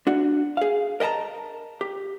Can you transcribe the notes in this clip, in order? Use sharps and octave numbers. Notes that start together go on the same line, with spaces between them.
D4 F#4
G#4 F5
A#4 D#5 F#5 A5 A#5
G4